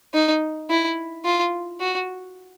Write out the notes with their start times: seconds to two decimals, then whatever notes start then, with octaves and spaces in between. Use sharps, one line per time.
0.14 D#4
0.70 E4
1.25 F4
1.80 F#4